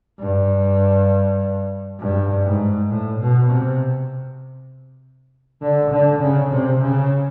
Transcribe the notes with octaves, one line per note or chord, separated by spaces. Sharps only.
G2
G2
G#2
A2
B2
C3
D3
D3
C#3
C3
C#3